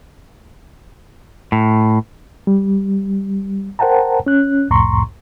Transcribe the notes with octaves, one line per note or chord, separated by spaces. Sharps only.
A2
G3
A#4 C5 F#5 G5 A5 A#5
C#4 F#6
C2 F2 A2 A#5 C6 C#6